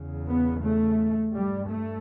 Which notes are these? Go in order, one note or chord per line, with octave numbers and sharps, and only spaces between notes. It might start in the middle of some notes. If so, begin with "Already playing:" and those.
Already playing: E2 C#3
B3
A3
G2 G3
A3